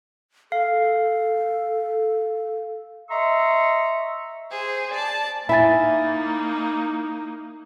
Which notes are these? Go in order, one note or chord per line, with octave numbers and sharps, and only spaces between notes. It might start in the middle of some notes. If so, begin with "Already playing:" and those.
A4 F5
D#5 E5 A#5 C6 C#6 E6
G#4 C5
D5 A5
A#3 D#4 E4 E5 G#5 B5 A6